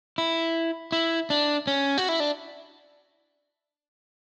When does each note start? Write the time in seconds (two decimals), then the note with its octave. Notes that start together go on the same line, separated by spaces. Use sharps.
0.18 E4
0.92 E4
1.30 D4
1.67 C#4
1.98 F#4
2.09 E4
2.20 D4